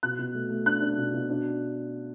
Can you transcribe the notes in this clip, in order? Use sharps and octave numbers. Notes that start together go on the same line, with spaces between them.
B2 F#6
B2
A3
A3
D4 F#6
D4
B2
B2
D4